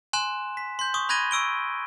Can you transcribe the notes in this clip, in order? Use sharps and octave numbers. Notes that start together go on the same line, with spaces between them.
G#5 C6 F#6 E7
B6
C6 G6
C#6 D#6
B5 F#6 G#6 A#6 D#7 G7
C#6 E6 D7 G7